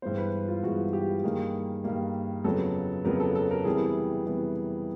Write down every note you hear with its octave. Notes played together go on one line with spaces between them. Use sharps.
G2 E3 G#3 B3 C5
B4
F4
G2 E3 G#3 B3 F#4
G4
G2 D#3 G3 A#3 G#4
G2 D#3 G3 A#3
F2 C#3 F#3 B3 A4
F2 C#3 F#3 B3 A#4
A4
A4
A#4
C3 E3 G3 B3 G#4
C3 E3 G3 B3